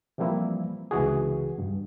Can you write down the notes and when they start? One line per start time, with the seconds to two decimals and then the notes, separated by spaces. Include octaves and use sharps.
0.18 E3 F3 G3 A#3 C4 E4
0.91 C#2 C3 E3 F#4 G#4
1.58 G2